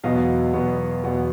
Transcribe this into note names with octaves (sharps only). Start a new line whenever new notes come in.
E2 B2 F#3 B3 D#5 F5
E2 B2 F#3 B3
E2 B2 F#3 B3